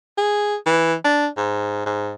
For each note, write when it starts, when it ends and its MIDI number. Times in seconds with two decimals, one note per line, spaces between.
0.18 0.56 68
0.66 0.94 52
1.05 1.27 62
1.37 1.84 44
1.86 2.13 44